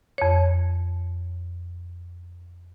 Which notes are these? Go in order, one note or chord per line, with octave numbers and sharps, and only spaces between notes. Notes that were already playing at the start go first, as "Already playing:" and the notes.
F2 C#5